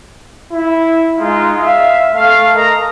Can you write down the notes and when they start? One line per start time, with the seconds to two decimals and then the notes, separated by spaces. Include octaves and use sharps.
0.53 E4
1.19 G#3 D#4 F4
1.58 E5 F5
2.15 A3 F5
2.56 A#4 D#5 A#5